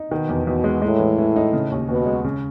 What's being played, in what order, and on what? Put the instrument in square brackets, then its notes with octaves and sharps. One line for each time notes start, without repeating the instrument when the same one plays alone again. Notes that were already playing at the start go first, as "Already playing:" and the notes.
Already playing: [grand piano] D#4
[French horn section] B2 [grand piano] D#3
[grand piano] E2
[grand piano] E2 [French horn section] B2
[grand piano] G#3
[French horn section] A2 [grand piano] G#3
[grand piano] E3
E3
D#4
C#3
D#2
[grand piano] D#2 [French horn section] B2
[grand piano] G#3
C#3